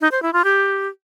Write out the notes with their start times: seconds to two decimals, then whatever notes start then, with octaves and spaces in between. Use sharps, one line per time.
0.01 D#4
0.12 C5
0.23 E4
0.33 F4
0.44 G4